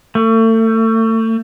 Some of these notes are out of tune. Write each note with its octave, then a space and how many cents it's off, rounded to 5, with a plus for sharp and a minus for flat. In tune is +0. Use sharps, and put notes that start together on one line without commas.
A3 +35